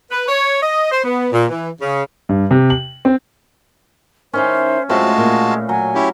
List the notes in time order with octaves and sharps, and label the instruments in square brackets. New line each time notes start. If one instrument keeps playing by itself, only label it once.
[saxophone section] B4
C#5
D#5
C5
B3
A#2
E3
C#3
[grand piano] G2
C3
F#7
C4
[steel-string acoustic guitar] D#3 D#4 E4 [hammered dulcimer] C#4 [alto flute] C5
[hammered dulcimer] A2 [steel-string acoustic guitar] F#3 C4 [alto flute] G#3 [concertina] F4 F#4 A5
[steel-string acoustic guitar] A#2
[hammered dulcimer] F#3 [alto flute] G#5
[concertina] C#4 E4 G4